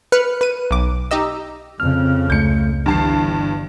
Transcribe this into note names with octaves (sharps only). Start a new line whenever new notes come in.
B4 F6 F#6 C#7
B4 D#7
B1 D6
D#4 G4 D#5 E6
F2 C#3 C4 F6
C#2 A3 G6 C#7
G1 G2 E3 A5 C7